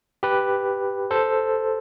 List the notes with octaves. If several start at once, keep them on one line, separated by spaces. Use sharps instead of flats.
G4 B4
A4 C5